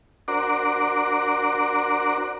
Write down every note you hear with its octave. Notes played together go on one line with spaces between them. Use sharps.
D4 F#4 A#4 C5 D5 D6